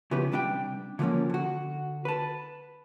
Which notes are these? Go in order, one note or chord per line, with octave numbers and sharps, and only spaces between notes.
C#3 E3 F3 B3 G4 B4
C3 G3 D4 E5 G5
D3 F3 F#3 A3 A#3 C#4
D3 F#4
B4 A5